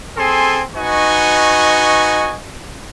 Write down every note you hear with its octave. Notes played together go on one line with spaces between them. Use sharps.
C4 G#4 A4 G#5 C6
D#4 F#4 B4 D#5 G#5 C#6